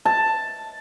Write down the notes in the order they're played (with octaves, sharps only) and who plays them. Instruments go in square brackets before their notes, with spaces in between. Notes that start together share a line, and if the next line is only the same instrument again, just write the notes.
[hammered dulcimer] A5